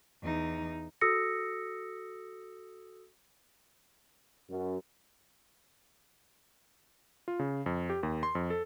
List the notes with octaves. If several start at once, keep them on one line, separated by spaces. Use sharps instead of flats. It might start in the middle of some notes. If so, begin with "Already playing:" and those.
E2 D#4
F#4 A4 D#6 E6 A#6 C#7
F#2
F4
C#3
F2
G4
D#2
C6
F2
A4